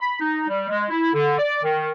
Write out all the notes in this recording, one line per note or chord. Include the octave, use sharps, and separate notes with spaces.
B5
D#4
G3
G#3
E4
D3
D5
D#3